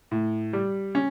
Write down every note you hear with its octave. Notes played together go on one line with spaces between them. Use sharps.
A2
G3
C#4